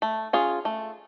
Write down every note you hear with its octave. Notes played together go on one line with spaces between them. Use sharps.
A3
C#4 F4 G#4
A3